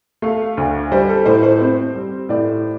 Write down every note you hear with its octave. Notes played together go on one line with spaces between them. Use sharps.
A3 F5
D2
G3 C5
A4
A2 C5
C5
C4
G3
A2 D5